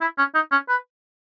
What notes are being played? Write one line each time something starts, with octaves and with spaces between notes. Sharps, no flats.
E4
C#4
D#4
C#4
B4